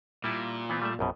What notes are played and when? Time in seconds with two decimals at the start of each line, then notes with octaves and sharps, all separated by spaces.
0.24 A#2 G3 E4 A5
0.69 E3 B3 C4
0.82 G3 A3 E5
0.99 A#1 F#2 B2